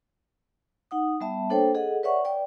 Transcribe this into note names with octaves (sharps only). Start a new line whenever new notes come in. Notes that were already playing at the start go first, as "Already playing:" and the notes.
D#4 F#5 D#6
G3 B3 E5 A5
A#3 D4 A4 C5 C#5 G5
G#4 A4 D#5 F#5
B4 C#5 D5 E5 F#5 C#6
B4 D5 G5